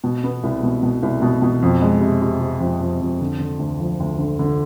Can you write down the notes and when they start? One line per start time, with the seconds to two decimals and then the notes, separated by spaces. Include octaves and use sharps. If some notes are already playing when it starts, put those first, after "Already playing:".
0.04 B2
0.24 B3
0.43 C2
0.63 B2
0.83 B2
1.03 C2
1.22 B2
1.42 B2
1.62 F2
1.82 G#3
2.01 C3
2.22 C3
2.41 C3
2.60 F2
2.81 F2
3.00 F2
3.21 D3
3.40 D3
3.59 D2
3.80 F3
4.00 D2
4.18 D3
4.39 D3